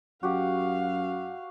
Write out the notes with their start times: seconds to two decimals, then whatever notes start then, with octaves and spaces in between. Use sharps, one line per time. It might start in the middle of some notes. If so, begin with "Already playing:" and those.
0.23 F#2 F#4 G4 F5